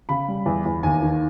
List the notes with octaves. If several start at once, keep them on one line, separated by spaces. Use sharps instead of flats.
C#3 B5
G3
E2
E2
D#2 G#5
D#3